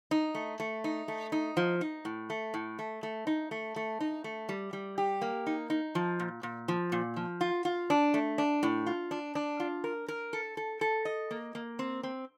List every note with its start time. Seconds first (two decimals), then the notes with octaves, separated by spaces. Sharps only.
0.11 D#4
0.35 A3
0.60 A3
0.84 D#4
1.08 A3
1.32 D#4
1.57 F3
1.81 D#4
2.05 A2
2.30 A3
2.54 A2
2.79 A3
3.03 A3
3.27 D#4
3.51 A3
3.76 A3
4.00 D#4
4.24 A3
4.49 G3
4.73 G3
4.98 G4
5.22 A#3
5.47 D#4
5.70 D#4
5.95 F3
6.20 A#2
6.43 A#2
6.68 F3
6.92 A#2
7.16 F3
7.41 F4
7.65 F4
7.90 D4
8.14 A3
8.38 D4
8.63 A2
8.86 F4
9.11 D4
9.35 D4
9.60 F4
9.84 A#4
10.08 A#4
10.33 A4
10.57 A4
10.81 A4
11.05 D#5
11.31 A#3
11.55 A#3
11.79 C4
12.03 C4